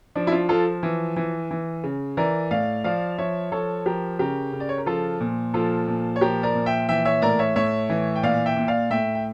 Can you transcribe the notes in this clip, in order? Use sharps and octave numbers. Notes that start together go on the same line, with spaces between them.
F3 D4
E4
D4 F4
F3 F4 A4
E3
E3
E3
C#3
E3 A#4 D5
A2 D5 F5
F3 D5 F5
F3 C#5 E5
F3 A4 C#5
F3 G4 A#4
C#3 G4 A#4
C#3
D5
C#5
A#4
F3 F4 A4
A#2
F3 F4 A4
A#2
C#5
F3 G4 A#4
A#4 D5
A#2
E5 G5
E3 E5 G5
C#5 E5
A2 A#4 D5
C#5 E5
A2 C#5 E5
E3
G5
A#2 D5 F5
E5 G5
A#2
D5 F5
A2 E5 G5
G5